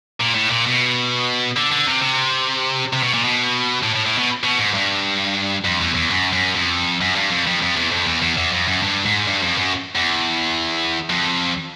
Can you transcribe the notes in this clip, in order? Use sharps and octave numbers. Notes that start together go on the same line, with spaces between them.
A#2
A2
A#2
B2
D3
D3
C3
C3
C3
B2
A#2
B2
A2
A2
A2
B2
B2
G#2
G2
F2
E2
E2
F#2
F#2
F2
F#2
G2
F2
F2
F2
E2
F2
E2
E2
E2
F2
F#2
G2
G#2
G2
F2
F#2
E2
F2